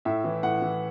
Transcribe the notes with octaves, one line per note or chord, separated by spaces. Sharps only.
A2 E5
E3
A2 F#5
E3